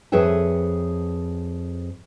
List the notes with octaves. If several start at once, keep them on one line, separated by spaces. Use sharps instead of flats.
F2 G#4 B4 C#5 E5 G5